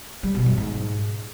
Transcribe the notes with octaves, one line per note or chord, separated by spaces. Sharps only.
G3
B2
F#2
G#2